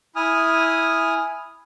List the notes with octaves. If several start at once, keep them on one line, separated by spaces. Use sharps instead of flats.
E4 G#5 D#6 F6